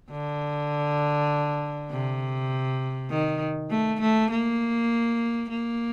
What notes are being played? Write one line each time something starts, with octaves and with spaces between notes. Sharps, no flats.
D3
C3
D#3
A3
A3
A#3
A#3